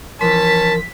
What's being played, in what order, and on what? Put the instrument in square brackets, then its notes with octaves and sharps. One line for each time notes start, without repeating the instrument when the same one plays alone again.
[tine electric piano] E3 F3 C6 [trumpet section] C#4 A5 [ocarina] A#4 [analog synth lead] B6